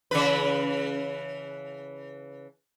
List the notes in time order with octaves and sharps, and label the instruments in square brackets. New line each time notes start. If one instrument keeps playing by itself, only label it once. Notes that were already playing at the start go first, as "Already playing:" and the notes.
[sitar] C#3 E3 B4